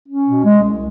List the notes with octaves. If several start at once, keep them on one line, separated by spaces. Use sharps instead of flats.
C#4
B2
G#3
C2